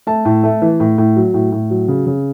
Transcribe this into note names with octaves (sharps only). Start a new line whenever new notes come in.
A3 A5
A2
A3
E3
A2
A2
F#3
A2
A2
F#3
C#3
C#3